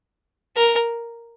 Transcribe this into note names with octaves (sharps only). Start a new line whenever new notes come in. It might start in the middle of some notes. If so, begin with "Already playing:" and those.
A#4